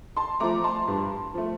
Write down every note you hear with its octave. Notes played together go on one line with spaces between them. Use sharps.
A5 C6
F3 A3 A#5 D6
A5 C6
G2
F3 A3